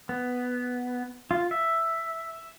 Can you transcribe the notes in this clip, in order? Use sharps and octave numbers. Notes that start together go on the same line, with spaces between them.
B3
F4
E5